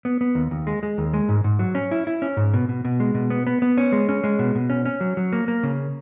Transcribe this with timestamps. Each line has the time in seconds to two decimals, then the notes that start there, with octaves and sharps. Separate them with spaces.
0.05 B3
0.21 B3
0.35 D#2
0.51 D#2
0.67 G#3
0.83 G#3
0.98 D#2
1.13 G#3
1.29 G#2
1.44 G#2
1.59 F#3
1.75 C#4
1.91 E4
2.07 E4
2.22 C#4
2.37 G#2
2.54 B2
2.69 B2
2.85 B2
3.00 G#3
3.14 B2
3.30 B3
3.47 B3
3.62 B3
3.77 C#4
3.92 G#3
4.09 C#4
4.24 G#3
4.39 B2
4.55 B2
4.70 C#4
4.85 C#4
5.01 F#3
5.17 F#3
5.32 A#3
5.48 A#3
5.63 C#3